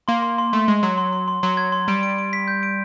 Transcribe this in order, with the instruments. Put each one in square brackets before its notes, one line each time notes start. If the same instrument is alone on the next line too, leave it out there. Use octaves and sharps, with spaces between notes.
[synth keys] A#3 [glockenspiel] C6
[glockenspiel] C6
C6
[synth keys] A3 [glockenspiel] C6
[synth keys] G#3 [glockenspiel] C6
[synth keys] F#3 [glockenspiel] C6
[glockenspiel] C6
C6
C6
[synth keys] F#3 [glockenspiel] C6
[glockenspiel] G#6
C6
[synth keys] G3 [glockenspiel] D7
[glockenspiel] D7
D7
B6
G6
D7